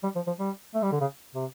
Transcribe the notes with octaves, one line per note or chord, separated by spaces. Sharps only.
G3
F3
F3
G3
A3
G3
D3
C#3
C3